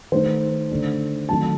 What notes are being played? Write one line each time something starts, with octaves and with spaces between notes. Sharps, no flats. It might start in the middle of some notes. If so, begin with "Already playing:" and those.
D#3 A3 D#4 C5
D3 A3 D4
D#3 F#3 A3 C4 A5